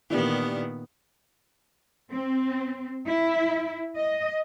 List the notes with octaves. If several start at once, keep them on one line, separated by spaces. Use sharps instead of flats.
A#2 D#3 E3 B3 D4 G4
C4
E4
D#5